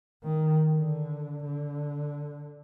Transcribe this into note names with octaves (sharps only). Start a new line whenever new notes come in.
D#3
D3
D3